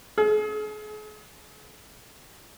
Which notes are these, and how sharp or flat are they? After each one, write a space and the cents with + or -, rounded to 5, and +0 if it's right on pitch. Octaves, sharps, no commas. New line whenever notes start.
G#4 +40